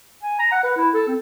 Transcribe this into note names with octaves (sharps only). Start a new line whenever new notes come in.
G#5
A#5
F#5
B4
E4
A4
C4